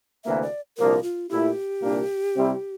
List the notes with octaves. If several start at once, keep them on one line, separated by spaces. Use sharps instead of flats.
D2 C3 E3 A#3 E5
D5
C2 A#2 F3 A#3 D4 A#4
F4
A#2 A3 E4 G4
C2 A#2 G3 A#3 D4
C3 G3 C4 E4